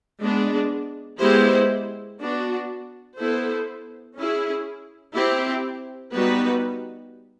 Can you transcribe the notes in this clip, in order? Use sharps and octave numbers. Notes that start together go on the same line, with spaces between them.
G#3 B3 D4
G#3 B3 E4 G4 C5
B3 D4 F#4
B3 E4 A4 C5
C#4 E4 G#4
C4 E4 G4
G3 B3 D#4 F#4 B4